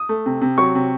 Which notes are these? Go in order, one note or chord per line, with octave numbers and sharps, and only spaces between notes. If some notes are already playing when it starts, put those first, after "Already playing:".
Already playing: D#6
A3
C3
C3
F#3 C#6
C3